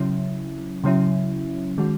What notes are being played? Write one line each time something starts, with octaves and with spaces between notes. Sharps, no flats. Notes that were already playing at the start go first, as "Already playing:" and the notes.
Already playing: C#3 F#3 C#4 E4
C#3 F#3 C#4 E4
D#3 G#3 C#4 F#4